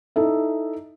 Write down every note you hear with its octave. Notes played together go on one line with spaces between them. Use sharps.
D#4 E4 A4 E5